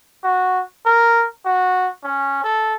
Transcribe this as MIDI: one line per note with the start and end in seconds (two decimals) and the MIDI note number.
0.24 0.62 66
0.85 1.26 70
1.45 1.89 66
2.04 2.40 61
2.44 2.74 69